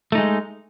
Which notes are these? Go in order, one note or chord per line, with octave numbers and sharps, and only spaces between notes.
G#3 A3 D#4